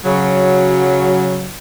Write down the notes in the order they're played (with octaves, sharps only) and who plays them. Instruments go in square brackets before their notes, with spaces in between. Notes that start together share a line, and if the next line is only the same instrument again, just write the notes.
[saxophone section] C#3 F#3